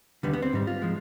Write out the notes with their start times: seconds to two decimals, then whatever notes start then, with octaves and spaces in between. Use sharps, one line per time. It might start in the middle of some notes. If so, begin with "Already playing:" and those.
0.23 D#2 D3 G3 B3
0.33 B3
0.42 C4
0.53 G#2 G3
0.67 F4
0.82 F3 G#3